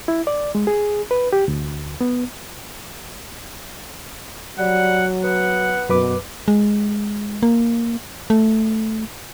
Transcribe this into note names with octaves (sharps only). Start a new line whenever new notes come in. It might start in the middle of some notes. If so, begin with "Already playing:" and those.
E4
D5
G#3
G#4
B4
G4
D2
B3
F#3 G3 F#5
B3 F#5
F#2 B2 B4 D6
G#3
A#3
A3